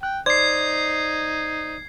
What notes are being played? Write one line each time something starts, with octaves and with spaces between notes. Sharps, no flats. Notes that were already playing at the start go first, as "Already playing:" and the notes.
G5 F#6
D#4 C5 D5 G#6 C7